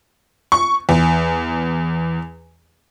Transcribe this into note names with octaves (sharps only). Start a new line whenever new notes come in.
C#6
E2